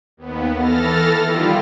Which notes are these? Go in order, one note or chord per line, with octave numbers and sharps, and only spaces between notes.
D#2 B3
E3 A4 F6 A6 A#6
D#3 G3 E4 F4 G4